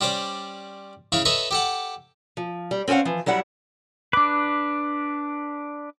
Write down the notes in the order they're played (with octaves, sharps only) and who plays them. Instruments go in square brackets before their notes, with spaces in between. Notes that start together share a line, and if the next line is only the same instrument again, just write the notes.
[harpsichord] G3 C#4 C5 D5
C#3 E4 C#5 F5
A4 B4 C#5 D#5 E5
G4 A4 F#5
[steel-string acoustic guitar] F3
G3
C4 C#4 A4 F5 F#5
E3 F3
F#3 G3 E4 F#5
[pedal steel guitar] D4 B4 [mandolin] D6